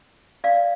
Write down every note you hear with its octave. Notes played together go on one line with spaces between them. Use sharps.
D5 F5